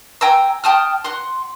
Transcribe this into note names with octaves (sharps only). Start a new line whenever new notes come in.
G5 G#5 A#5 E6
G5 A5 D#6 F6
F#5 C6